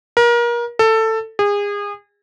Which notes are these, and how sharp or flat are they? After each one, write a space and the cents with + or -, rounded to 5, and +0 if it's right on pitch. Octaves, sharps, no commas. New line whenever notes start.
A#4 +30
A4 +15
G#4 -30